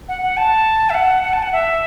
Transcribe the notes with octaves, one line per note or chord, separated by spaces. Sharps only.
F#5
F#5
A5
E5
F#5
F#5
A5
F#5
E5